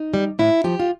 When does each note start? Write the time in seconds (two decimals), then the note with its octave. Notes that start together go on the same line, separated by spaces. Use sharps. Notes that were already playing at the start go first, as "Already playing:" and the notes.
Already playing: D#4
0.14 G3
0.39 A2 E4
0.64 F3 G4
0.80 F4